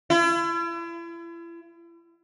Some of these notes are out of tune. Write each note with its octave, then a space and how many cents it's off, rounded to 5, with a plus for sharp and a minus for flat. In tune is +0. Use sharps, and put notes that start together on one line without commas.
E4 +40